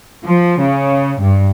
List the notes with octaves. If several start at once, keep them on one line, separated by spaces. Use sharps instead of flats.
F3
C#3
G2